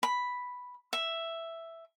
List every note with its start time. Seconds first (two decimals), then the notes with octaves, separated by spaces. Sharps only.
0.03 B5
0.93 E5